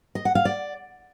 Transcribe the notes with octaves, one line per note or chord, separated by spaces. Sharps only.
D#5
F#5
F5
D5